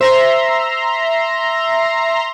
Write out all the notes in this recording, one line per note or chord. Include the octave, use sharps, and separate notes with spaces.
C5 E5 A#5 C6